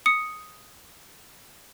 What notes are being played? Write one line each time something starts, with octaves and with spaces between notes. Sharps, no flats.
D#6 C#7